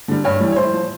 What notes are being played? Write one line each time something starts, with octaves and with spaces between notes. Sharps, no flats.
D3 G3
G2 C#5
E3 G3
C#5
A2 C5
F3